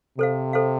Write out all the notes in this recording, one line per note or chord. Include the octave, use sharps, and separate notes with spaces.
C3 A4 C5 F5
A4 C5 F5